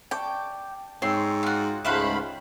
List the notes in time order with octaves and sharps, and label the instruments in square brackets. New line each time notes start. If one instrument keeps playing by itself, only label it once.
[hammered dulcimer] D5 A5 C#6 [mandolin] G5
[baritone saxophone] G#2 [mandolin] C4 C6 [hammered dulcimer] C#5 G5
[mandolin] F4 F#4
[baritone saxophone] C#2 [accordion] G#2 A3 B5 [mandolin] C5 F5 F#5